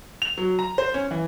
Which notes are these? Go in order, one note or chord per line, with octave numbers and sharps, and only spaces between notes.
F7
F#3
A#5
C5
C#4
E3